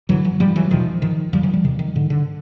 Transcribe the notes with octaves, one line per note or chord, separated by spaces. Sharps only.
G2 D3 E3 F#3
E3 F#3
G#2 F3 G3
E3 F#3
E2 B2 D#3 F3
G#2 D#3 F3
F2 D3 F3 G3
E3 F#3
F3 G3
E2 C3 D#3
D#3
G#2 D3
D3